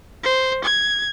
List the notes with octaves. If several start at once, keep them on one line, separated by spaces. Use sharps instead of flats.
C5
G#6